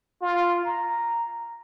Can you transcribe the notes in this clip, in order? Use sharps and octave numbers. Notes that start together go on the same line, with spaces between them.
F4
A#5